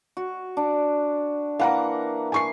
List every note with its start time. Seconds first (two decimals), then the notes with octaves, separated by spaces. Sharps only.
0.17 F#4
0.57 D4
1.59 E3 A#3 F5 F#5 A#5
2.32 G#5 C#6 C7